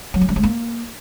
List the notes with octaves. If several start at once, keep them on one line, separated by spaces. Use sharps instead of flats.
F#3
C#4
G3
G#3
A#3